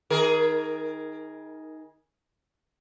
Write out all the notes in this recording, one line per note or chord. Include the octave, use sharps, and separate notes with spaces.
D#3 G#4 A#4